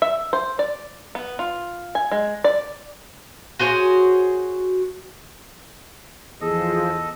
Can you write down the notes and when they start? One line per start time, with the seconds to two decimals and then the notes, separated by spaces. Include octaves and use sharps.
0.02 E5
0.33 C5
0.59 D5
1.15 B3
1.39 F4
1.95 G#5
2.12 G#3
2.44 D5
3.59 F#4 G#4 C5 C#5
6.41 E2 F3 G#4 A4 D#5